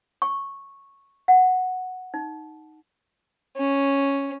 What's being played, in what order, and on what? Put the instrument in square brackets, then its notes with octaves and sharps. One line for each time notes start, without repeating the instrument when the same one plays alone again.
[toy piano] C#6
F#5
D#4
[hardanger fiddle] C#4